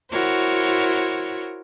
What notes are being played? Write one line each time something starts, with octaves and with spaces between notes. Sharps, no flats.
E4 F#4 A#4 C5 C#5